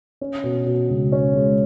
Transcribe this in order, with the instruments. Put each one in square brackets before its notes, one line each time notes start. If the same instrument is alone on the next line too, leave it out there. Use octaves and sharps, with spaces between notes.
[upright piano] C#4
B2
B2
C#2
C#4
G#3